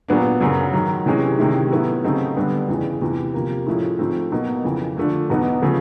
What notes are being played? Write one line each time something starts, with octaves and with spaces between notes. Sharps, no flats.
A#2 F#3 B3 D4
F#2 C#3 F#3
G#2 D#3 F#3
C3 E3 G#3 C#4
C3 D#3 G#3 C#4 E4
A2 F#3 B3 E4
C#3 F#3 A3 C4 D#4
G2 D3 G3 B3 D4
E2 C#3 E3 G#3
E2 C3 E3
C3 F3 A#3
A2 F3 G#3 C#4 E4
G#2 F3 A3 C4
B2 F#3 A#3 D#4
F2 C#3 E3
D3 F3 A3 D4
E2 B2 F#3 B3 D#4
C#3 F3 A3